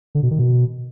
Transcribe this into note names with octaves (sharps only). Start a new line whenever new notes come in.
D3
B2
D#3
B2